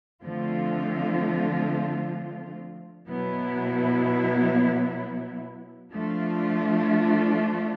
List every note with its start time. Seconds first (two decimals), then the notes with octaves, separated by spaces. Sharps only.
0.23 D3 F3 A3 C4 F4
3.08 B2 F#3 B3 E4
5.93 F3 A3 D4 F4